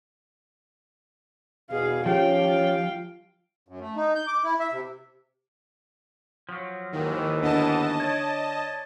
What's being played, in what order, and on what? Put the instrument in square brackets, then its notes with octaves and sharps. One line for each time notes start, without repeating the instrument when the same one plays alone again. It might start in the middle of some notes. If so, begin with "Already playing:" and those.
[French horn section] E2 B2 [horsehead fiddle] G#4 F5
[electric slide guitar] F3 [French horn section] C#4 G4 [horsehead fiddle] F5 G5
[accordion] F#2
A3
D#4
G6
D6
E4
E5
C3
[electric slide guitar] F3 F#3
[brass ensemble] D#2 G#2 E3 [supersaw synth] D#3
[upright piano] D3 [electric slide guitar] B3 [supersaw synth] D#5 A5
[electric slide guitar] C#5 D5